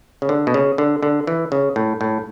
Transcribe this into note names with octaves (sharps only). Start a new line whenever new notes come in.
C#3
D3
B2
C#3
D3
D3
E3
C#3
A2
A2